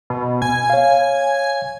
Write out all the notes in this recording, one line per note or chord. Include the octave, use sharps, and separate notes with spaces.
B2
G#5
C#5 F5